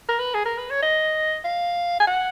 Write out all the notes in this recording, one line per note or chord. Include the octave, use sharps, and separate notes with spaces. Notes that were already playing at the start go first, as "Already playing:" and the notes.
A#4
B4
G#4
A#4
B4
C#5
D#5
F5
G#5
F#5